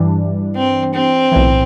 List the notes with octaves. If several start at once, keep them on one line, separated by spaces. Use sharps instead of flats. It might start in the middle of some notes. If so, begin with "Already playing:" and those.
Already playing: G2 E3 G3 D4
C4
C4
B1 A2 E3